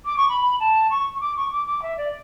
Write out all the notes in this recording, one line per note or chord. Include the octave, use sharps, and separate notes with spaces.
D6
C#6
B5
A5
C#6
C#6
D6
C#6
D6
D6
E5
D5